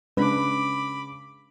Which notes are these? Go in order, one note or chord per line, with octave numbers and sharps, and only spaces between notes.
C#3 G#3 D4 B4 B5 D6